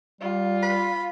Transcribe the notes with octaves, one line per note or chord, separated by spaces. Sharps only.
G3 F4
B5